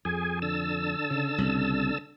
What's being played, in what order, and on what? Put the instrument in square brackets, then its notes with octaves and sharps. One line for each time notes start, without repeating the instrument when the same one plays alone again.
[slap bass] F2 [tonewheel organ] G#4 G#5
[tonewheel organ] D3 A5 E6
[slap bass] C#3
C2 C#3